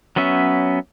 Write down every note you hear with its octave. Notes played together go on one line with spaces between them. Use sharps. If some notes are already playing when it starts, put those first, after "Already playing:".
F#3 B3 C#4 E5